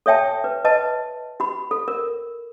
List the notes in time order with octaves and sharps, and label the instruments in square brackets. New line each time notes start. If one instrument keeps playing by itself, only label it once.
[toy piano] A4 C#5 E5 G5 A5
B4
B4 D#5 A5
F#4 B5
A4
A#4